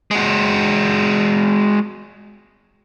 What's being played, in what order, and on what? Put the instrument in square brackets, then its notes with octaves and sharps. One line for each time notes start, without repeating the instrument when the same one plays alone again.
[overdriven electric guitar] G#3 F#4